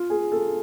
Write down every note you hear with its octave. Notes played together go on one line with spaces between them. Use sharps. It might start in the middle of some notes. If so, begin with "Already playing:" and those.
Already playing: F4
G#4
A4